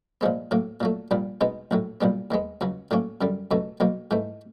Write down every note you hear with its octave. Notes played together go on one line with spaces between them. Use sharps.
A#2 F3 G#3 B3
A2 F#3 A#3
A#2 F#3 A3
A#1 A#2 G3
B2 G#3 B3 D#4
A#1 A2 F#3
B1 A#2 G3 B3
D#2 D#3 G#3 B3
C#2 C#3 F#3
A2 F#3 A#3 C#4
F#2 D3 G3
C#2 B2 F#3 A3
B1 B2 F#3 A#3
G#2 E3 A3